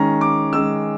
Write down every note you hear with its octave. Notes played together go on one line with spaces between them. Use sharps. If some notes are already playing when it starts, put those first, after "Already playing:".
Already playing: D#3 G#3 C#4 A#5
D6
D#3 G#3 C#4 E6